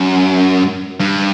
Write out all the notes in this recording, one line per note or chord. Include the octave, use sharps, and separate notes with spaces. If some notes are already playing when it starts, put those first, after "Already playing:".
Already playing: F#2
G2